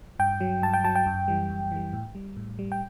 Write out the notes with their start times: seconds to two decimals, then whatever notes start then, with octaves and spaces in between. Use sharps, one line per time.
0.19 G2 G5
0.40 F#3
0.62 G2 A5
0.73 G5
0.84 F#3 A5
0.95 G5
1.06 F#2
1.28 E3 G3
1.50 F#2
1.72 E3 G3
1.93 A2
2.15 G3
2.37 A2
2.59 G3
2.72 G5